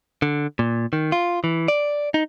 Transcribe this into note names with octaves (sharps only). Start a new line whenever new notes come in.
D3
A#2
D#3
F4
E3
D5
D#4